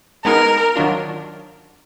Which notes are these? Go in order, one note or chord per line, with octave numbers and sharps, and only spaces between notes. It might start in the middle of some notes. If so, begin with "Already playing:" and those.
G#3 B3 D#4 G#4 A#4
D#3 F#3 D4 F4